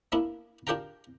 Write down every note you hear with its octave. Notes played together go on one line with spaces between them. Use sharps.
A#3 B3 D4 E4
D4 F4 G4 A#4 G5 A#5